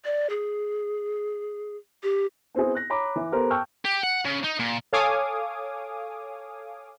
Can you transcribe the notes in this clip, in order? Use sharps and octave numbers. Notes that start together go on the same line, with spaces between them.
D5
G#4
G4
B3 C4 E4 G#4
F#6 A#6
C#5 A#5 B5 D6
E3
B3 G4 A4 A#4 C5
G5 A5 C#6 E6 F6 G6
G4
F#5
C#3
D#4
A#2
A4 C#5 F5 G#5 D6 D#6